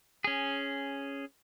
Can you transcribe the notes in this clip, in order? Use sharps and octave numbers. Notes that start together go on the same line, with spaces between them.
C#4 G#4